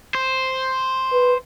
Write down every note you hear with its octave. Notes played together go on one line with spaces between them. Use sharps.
C5
B4